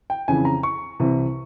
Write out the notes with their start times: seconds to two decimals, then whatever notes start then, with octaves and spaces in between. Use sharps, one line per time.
0.10 G5
0.28 F2 C#3 E3 G#5
0.45 A#5
0.63 C#6
1.00 C2 C3 E3